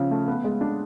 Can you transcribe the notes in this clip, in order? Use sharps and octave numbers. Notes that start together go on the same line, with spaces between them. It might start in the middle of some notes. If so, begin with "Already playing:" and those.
Already playing: C#3 F3
A3
B3
G#3
D4